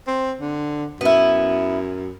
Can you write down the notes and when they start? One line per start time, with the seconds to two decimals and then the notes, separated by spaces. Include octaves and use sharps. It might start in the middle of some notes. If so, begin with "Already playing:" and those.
0.07 C4
0.41 D3
1.01 F#2 B3 E4